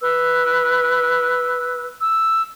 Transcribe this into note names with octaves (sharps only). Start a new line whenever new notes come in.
B4 E6
E6